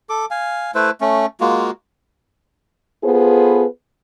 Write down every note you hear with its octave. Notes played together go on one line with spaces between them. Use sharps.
A4 D6
F5 G#5
A3 E4 B4 C5
A3 C#4
G#3 A#3 F4 F#4
B3 F4 G#4 A4 B4 C5